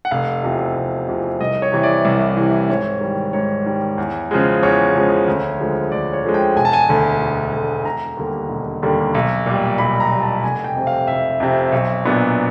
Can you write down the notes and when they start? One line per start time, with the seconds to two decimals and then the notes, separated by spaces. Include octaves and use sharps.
0.05 F#5
0.11 F1 F5
0.43 E2 C3 F3
0.76 F1
1.08 E2 C3 F3
1.40 C2 D#5
1.62 C#5
1.72 C3 E3
1.83 D5
2.05 C2
2.37 C3 E3
2.70 G#2 C#5
3.01 D#3 G3
3.33 G#2 C#5
3.66 D#3 G3
3.98 E2
4.31 C#3 F3 G#3
4.63 E2 C#5
4.94 C#3 F3 G#3
5.28 D2
5.60 D3 F3 G#3
5.92 D2 D5
6.13 C#5
6.24 D3 F3 G#3
6.34 G5
6.56 E1 G#5
6.65 A5
6.73 G#5
6.89 D2 D3
7.21 E1
7.53 D2 D3
7.85 E1 A#5
8.17 D#2 D3 G3 A#3
8.49 E1
8.83 D#2 D3 G3 A#3
9.14 B1
9.46 A#2 G3
9.78 B1 B5
10.00 A#5
10.11 A#2 G3
10.22 A5
10.43 F1 G#5
10.64 G5
10.76 F2 C3
10.87 F5
11.07 F1 E5
11.40 F2 C3
11.72 B1
12.05 A#2 F#3 B3 D4